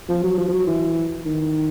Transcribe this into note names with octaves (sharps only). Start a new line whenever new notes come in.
F3
F#3
F3
F3
F#3
E3
D#3